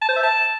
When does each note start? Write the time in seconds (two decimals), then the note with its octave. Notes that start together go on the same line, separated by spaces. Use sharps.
0.02 A5
0.09 C5
0.16 E5
0.24 A5